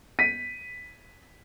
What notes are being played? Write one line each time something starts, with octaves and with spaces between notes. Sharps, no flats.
B6 D#7